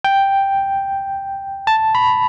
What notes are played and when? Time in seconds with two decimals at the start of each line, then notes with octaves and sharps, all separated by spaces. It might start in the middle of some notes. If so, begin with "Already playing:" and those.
0.04 G5
1.67 A5
1.95 B5